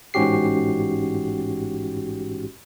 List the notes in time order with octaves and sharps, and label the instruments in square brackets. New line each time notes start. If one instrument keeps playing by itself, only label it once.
[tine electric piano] A1 G#2 C#4 F#4 G4 C7